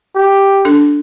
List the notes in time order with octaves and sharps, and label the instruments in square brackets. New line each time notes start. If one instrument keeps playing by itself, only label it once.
[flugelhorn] G4
[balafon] D4 A4